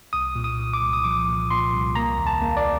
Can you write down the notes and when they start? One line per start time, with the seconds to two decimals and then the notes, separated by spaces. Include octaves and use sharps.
0.13 C2 D#6
0.35 A#2
0.44 D#6
0.59 A#2
0.73 D6
0.81 C2
0.93 D#6
1.04 F3 D6
1.28 A#2
1.50 A#2 C6
1.73 C2
1.95 A#3 A#5
2.18 D#2
2.27 A5
2.42 A#3
2.57 D5